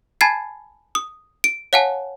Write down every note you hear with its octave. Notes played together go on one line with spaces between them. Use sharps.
G#5 A5 B5 G#6 A6 C7
D#6
D7
C#5 F5 F#5 G#5 A5